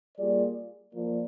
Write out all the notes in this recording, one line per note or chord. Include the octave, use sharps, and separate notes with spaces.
G3 A#3 F4 G#4 D5
F3 A#3 F4 A#4 D5